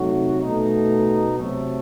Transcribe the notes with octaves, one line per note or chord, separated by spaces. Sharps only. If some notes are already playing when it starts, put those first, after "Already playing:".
Already playing: C3 F#3 A3 D#4 F#4
B2 A3 D#4
C3 F#3 A3